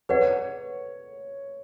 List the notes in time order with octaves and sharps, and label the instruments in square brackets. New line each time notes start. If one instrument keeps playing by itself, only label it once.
[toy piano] G#4 B4 D5 F#5 [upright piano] C#5